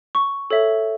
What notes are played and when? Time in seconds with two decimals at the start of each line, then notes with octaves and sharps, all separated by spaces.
0.15 C#6
0.50 A4 C#5 E5